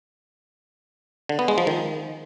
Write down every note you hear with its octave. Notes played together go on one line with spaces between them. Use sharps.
D3
B3
G#3
F3
D#3